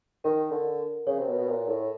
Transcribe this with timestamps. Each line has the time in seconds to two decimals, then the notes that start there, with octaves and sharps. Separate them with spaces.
0.24 D#3 A#4
0.51 D3
1.07 C#3 C#5
1.19 C3
1.28 B2
1.39 B2
1.49 A#2
1.69 A2